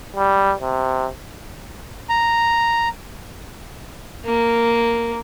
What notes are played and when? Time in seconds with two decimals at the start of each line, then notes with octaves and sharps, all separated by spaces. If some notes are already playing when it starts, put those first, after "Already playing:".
0.16 G3
0.61 C3
2.10 A#5
4.25 A#3